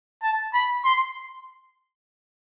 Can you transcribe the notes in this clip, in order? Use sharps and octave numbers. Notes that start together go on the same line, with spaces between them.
A5
B5
C6